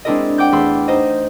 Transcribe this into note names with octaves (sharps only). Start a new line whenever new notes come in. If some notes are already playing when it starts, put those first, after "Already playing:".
G#3 C4 D4 E4 A#4 D#5
F#5 G5 D6 G6
E2 A3 B5 C6 E6
D#4 C5 D#5